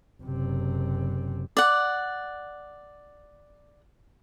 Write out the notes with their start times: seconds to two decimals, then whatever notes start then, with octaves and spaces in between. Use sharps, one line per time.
0.22 F#1 C3
1.57 D5 F#5